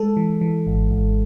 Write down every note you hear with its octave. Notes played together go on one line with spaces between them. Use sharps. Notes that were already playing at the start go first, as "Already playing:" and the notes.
Already playing: G#3 A4
E3
E3
G#1
G#1